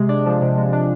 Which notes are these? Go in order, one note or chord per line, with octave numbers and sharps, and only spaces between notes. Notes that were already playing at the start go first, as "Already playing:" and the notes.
Already playing: C3 G#3
D4
F3
C3
G#3
D4